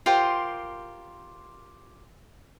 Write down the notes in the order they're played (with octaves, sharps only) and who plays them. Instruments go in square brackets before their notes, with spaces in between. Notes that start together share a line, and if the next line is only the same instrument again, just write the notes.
[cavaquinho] F4 G4 A#4 C5